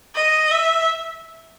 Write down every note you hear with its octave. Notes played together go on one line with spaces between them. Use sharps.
D#5
E5